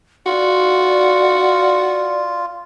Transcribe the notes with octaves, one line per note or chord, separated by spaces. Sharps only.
F4 F#4 D5